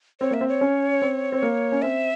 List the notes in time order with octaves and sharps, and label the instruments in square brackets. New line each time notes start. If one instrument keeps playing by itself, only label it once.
[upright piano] C4 [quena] C#5
[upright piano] A#3 [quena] E5
[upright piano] C4
[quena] C#5
[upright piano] C#4
C4
C4
A#3
C#4
[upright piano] C4 [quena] E5